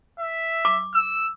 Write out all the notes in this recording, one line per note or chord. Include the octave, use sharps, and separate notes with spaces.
E5
D6
E6